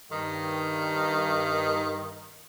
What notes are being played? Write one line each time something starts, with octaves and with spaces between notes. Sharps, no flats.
G2 D#3